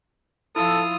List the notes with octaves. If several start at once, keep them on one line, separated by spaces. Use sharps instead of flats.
F3 E4 F4 A4 D#6 E6